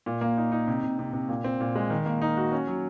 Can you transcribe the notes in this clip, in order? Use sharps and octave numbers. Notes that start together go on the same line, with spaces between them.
A#2
A#3
D#4
D#4
C3
C3
C3
C3
A#2
C4
A#2
G#3
D#3
A#3
D#4
F#4
C#4
F#3